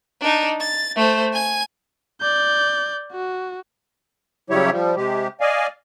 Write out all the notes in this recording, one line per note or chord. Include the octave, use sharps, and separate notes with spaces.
D4 D#4
A6
A3 C5
G#5 G#6
D5 G6
F#4
C#3 F#3 G3 E4 G4 C#5
F3 G3
C3 G#3 G4
D5 D#5 F5 G#5